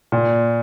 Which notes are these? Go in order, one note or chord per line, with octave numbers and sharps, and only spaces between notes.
A#2